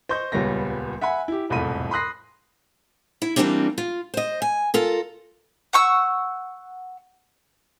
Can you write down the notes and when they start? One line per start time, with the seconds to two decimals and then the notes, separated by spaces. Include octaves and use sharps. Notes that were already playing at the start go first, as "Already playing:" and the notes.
0.09 C5 D#5 C#6 G6
0.32 D#1 C#2 G3 B3 C#5 A#6
1.01 E5 F#5 G#5 B5
1.28 E4 G4
1.50 E1 C2 F2 A2 B5 D#7
1.91 B5 C6 D#6 F#6 A#6 C7
3.22 E4
3.36 E3 F#3 G3 A#3 C4 D4
3.78 F4
4.14 C5 D#5
4.42 G#5
4.74 F4 A4 A#4
5.73 F#5 C#6 E6